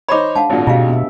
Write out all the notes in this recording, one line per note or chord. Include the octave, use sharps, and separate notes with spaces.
D#4 C5 C#5 B5 D6
G#3 D4 F5 F#5 A5
G#1 A#2 A3 D4 F#4
B2 G#3 F4 G4 F5
B3 E5